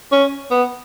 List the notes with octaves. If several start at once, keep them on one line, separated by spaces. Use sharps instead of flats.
C#4
B3